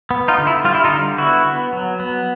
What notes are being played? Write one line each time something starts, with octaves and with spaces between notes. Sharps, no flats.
B3
D#4 F4
D3
E4
G3 F4
E4
D#4 F4
D3
B3 E4 F#4
B3
F#3
B3